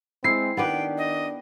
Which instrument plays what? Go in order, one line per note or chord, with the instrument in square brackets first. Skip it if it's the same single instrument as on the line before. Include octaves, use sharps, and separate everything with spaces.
[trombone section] G#3 C4 [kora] E4 [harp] C7
[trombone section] D#3 D4 [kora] B3 G4 B4 [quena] G5
[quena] D#5